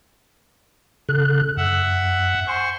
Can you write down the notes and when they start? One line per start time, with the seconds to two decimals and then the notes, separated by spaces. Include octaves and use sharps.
1.09 C#3 A4 F#6
1.57 F#2 E5 F#5
2.47 C5 G#5 C6 C#6